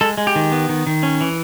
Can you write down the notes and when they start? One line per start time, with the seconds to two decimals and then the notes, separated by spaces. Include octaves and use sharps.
0.01 G#3 A4
0.18 G#3
0.27 G4
0.36 D#3
0.52 B3
0.69 D#3
0.87 D#3
1.03 C#4
1.21 E3